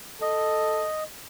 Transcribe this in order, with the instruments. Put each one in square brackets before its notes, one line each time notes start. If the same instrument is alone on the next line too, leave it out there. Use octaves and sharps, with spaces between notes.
[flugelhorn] A4 [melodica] D#5